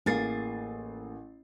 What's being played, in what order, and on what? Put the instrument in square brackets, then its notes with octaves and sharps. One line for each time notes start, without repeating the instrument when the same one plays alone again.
[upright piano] A1 A6 C7 [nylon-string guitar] A#3 G#4